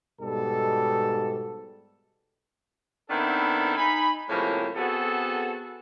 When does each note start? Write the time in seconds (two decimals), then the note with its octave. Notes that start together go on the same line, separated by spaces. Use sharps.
0.20 G#2 B2 G3 A4
3.09 D#3 B3 C4 D4 E4 A4
3.76 D#4 G#5 B5
4.28 A2 C3 F3 G#3 A#3 C#4
4.76 B3 C4 F#4 G#4 A4